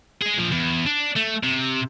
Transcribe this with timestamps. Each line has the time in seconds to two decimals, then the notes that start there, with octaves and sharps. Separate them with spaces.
0.21 G#3 G#4
0.37 A#2 F3
0.51 E2
0.86 D4
1.16 A3
1.43 C3